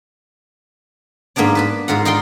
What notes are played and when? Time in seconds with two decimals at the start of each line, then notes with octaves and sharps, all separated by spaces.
1.36 G#2 A#3 B3 D4 D5
1.55 B4 A5 B5
1.88 G#2 F4 A#4 F#5
2.05 D#4 F4 D5 G5 C6